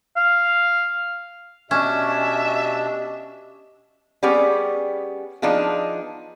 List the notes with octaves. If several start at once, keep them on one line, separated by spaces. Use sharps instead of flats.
F5
B2 C#4 D4 G4 D#5 E5
G3 B3 C#4 G4 G#4
F3 B3 D4 D#4 F4 G#4